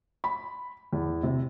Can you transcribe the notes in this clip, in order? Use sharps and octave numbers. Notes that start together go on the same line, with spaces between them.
B5
E2
C3